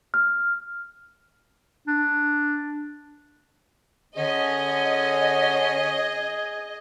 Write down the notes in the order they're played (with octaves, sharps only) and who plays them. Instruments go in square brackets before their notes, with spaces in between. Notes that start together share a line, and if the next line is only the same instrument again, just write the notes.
[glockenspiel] F6
[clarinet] D4
[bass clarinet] D3 [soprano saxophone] C#4 [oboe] G#4 [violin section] D#5